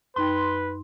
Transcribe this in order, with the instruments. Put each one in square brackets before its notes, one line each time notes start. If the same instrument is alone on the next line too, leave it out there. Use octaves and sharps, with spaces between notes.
[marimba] F#2 D#4 G5 [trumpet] B4 [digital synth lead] C6